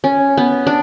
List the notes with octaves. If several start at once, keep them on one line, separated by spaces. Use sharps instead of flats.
C#4
B3
D4